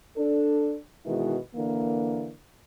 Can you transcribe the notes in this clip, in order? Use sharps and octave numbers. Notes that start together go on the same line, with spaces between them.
D4 A4
B2 D#3 E3 G#3
D3 E3 A#3